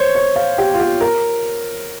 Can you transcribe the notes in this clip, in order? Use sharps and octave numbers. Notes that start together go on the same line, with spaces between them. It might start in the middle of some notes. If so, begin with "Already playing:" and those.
Already playing: C5 C#5
C#5
F5
G4
F4
G4
A#4